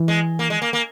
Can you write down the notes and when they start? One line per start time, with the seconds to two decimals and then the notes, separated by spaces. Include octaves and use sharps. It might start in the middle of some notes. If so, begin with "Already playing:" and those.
Already playing: E3
0.08 G#3
0.39 A#3
0.50 G#3
0.62 A#3
0.73 A#3